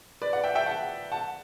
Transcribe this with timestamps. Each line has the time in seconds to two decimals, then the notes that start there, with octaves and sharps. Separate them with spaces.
0.22 B4 D5
0.33 D5 F#5
0.44 E5 G5
0.55 E5 G5
0.66 F#5 A5
1.12 F#5 A5